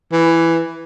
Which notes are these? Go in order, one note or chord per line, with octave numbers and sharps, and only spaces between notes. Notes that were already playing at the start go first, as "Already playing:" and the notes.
E3